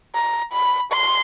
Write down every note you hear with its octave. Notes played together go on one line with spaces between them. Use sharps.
A#5
B5
C6